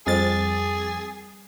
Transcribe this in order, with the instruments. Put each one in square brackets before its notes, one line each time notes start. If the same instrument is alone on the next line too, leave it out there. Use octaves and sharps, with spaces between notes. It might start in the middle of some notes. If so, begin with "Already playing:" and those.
[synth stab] F2 A6 [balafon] G3 A4 C5 [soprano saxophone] G#4